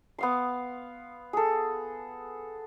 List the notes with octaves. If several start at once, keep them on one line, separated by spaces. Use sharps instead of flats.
B3 F5 C6
G#4 A4